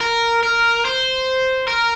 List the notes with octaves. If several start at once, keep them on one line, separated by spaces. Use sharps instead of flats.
A#4
A#4
C5
A#4